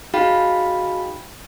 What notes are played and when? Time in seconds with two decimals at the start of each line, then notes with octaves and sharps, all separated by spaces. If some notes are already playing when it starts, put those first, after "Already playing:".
0.14 D#4 F#4 G#4 F5 G5 B5